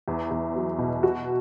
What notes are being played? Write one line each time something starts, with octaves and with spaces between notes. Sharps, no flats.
E2
E2
F#3
B2
F#4